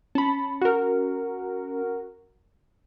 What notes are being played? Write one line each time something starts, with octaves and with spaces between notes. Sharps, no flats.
C#4 A5 B5
F#4 A#4